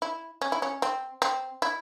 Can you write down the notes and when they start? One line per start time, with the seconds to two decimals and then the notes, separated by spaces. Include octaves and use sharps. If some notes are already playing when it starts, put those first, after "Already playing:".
0.02 E4
0.42 C#4
0.52 E4
0.62 C#4
0.82 C4
1.22 C4
1.62 E4